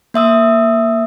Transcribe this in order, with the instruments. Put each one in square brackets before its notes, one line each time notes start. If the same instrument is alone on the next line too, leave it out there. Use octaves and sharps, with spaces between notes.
[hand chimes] A#3 E5 D#6 E6